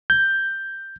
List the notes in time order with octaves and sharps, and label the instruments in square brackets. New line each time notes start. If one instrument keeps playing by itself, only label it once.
[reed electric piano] G6